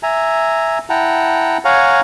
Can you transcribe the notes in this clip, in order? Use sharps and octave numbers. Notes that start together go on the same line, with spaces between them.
E5 G#5 A#5
E4 F#5 G5 A5 A#5
C#5 F5 F#5 G#5 A#5